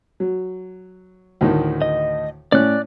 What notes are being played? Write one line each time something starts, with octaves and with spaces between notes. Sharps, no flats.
F#3
D2 A2 D#3
D#5
A2 C#4 D5 F#6